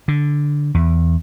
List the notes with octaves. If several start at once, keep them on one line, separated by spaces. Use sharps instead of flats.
D3
E2